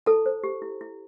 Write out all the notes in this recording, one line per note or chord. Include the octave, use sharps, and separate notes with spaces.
E4 A4 A5
C5
G4
E4
E4